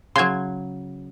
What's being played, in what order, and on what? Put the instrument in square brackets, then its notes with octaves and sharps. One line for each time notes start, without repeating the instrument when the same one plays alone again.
[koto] C#3 F#3 [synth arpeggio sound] C6 G#6